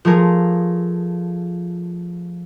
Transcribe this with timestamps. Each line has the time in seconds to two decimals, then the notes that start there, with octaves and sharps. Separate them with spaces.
0.05 F3 A3 G#4 A#4